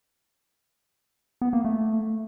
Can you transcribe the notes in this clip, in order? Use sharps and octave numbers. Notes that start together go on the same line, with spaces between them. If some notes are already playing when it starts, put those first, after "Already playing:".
B3
A#3
A3